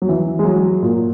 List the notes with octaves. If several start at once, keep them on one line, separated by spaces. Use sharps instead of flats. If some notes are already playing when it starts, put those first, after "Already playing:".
F#3
E3
G#3
F#3
A#2